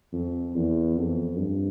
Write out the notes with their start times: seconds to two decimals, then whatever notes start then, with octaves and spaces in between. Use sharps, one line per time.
0.13 F2
0.55 E2
0.96 F2
1.37 G2